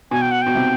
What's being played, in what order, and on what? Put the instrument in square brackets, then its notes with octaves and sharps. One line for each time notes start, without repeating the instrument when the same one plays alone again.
[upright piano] B2 [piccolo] G#5
[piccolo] G5
F#5
[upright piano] B2 [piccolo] G5
[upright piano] C3